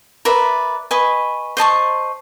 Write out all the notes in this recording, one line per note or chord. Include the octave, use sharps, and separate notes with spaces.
A#4 B4 D5 E5
B4 D#5 G#5 C#6
C5 D#5 A5 C#6